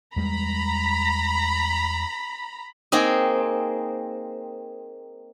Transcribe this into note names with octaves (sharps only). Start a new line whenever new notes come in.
E2 G3 G#3 A#5 B5
A#3 C4 D#4 G#4